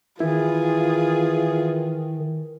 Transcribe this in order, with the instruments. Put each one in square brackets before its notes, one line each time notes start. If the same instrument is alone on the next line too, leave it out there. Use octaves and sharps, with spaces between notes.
[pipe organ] D#3 [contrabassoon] E3 [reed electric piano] E4 [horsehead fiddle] F4 G#4